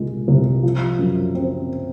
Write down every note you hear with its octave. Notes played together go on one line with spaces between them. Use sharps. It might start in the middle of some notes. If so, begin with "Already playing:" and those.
Already playing: C2 A#2 G#3
C2
F3
F#2
C4